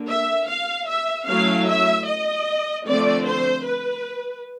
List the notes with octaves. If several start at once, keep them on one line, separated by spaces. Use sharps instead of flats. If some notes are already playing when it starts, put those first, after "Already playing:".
Already playing: D3 A#3
E5
F5
E5
F#3 A3 C#4 E4 F5
E5
D#5
D3 F3 A3 C4 D5
C5
B4